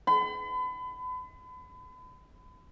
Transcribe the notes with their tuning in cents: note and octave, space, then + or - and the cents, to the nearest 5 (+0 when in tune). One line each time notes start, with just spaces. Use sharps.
B5 +35